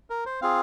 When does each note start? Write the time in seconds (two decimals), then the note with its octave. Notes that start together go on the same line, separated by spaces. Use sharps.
0.10 A#4
0.26 C5
0.42 C4 F4 G#4 F5